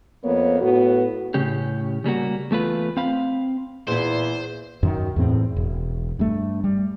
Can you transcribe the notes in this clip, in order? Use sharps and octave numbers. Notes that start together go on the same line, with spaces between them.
F2 A#3 B3 C#5
A2 B3 F#4
A2 C#3 C#4 G4
C#3 G3 A#3 F#4
E2 A3 F4 B4
C4 F5 B5
E2 A#2 E4 C5
F#2 D#3
E2 A2 C4
E1
G2 A3
G3